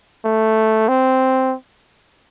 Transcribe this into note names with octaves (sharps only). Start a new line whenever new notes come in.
A3
C4